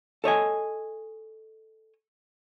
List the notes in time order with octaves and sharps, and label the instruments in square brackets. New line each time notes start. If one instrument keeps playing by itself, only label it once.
[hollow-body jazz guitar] A4 C#5 D#5 G#5